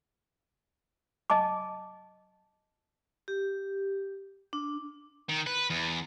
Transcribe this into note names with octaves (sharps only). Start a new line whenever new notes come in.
D#5 G#5 A5 D6
G4
D4
D#3
B4
E2